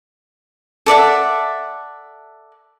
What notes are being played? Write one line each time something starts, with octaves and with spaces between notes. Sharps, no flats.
A4 D5 E5 F#5